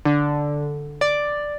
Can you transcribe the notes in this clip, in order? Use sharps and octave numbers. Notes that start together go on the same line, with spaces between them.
D3
D5